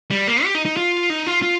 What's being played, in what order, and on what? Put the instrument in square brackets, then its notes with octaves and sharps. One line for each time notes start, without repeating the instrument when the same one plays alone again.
[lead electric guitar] G3
A#3
G4
D#4
D#4
F4
D#4
F4
F4